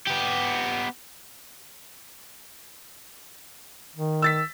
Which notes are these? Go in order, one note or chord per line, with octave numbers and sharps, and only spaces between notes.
B3 G4
D#3
E6 A6 B6